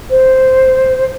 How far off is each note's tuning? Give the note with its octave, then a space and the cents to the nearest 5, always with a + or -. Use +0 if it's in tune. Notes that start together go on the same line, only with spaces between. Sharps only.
C5 -5